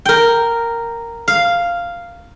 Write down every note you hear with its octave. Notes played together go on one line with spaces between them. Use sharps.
A#4 G5
F5